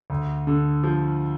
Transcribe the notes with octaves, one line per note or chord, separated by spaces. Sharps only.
D2
D3
F3